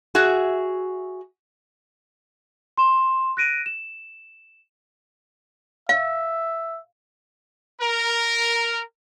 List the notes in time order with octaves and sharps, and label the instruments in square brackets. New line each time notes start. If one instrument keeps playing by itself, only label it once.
[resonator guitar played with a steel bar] F#4 G#4 E5
[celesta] C6 E7
F#6 A#6 D7 D#7
E7
[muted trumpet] E5 [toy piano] F5
[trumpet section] A#4